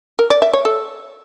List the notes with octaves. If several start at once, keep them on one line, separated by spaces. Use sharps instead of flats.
A#4
D5
E5
C#5
A4